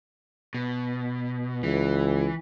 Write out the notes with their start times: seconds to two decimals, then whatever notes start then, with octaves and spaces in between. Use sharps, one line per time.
0.54 B2
1.63 C#2 E3